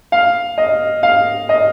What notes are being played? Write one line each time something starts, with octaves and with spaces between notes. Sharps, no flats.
F5
D#5
F5
D#5